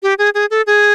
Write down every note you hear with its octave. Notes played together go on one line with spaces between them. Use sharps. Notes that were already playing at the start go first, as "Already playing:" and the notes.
G4
G#4
G#4
A4
G#4